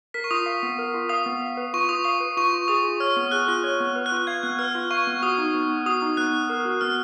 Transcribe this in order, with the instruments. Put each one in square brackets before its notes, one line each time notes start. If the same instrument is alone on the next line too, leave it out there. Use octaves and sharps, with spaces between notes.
[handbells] A#4 [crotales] B6
[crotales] C#6
[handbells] F4 [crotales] D#6
[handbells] F5
B3
A#4
F4
[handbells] F5 [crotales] D#6
[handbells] B3
F5
B4
[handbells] F4 [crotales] C#6
[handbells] F4 [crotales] D#6
[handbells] F5 [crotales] D#6
[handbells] B4
[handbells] F4 [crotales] C#6
[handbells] F4
[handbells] G#4 [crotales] D#6
[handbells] F4
[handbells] C#5 [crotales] F6
[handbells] B3
[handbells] G#4 [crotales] F#6
[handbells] F4 [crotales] F#6
[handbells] C#5
B3
B4
[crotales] F#6
[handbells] F4
[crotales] F#6
[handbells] F5 [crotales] G#6
[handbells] B3 [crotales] F#6
[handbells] B4 [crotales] F6
[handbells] F4
[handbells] F5 [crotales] C#6
[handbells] B3
[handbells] F#4 [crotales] D#6
[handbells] D#4
B3
B3
[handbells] F#4 [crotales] D#6
[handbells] D#4
[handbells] B3 [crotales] F#6
[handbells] B3
A#4
F#4
[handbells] B3 [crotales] F6